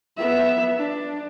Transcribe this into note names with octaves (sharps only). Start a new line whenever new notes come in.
B3 E5
D4